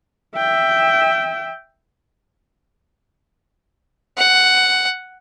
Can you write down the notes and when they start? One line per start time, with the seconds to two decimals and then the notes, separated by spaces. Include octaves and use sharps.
0.36 E5 G5
4.18 F#5